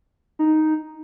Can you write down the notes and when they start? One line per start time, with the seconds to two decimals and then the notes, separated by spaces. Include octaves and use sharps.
0.39 D#4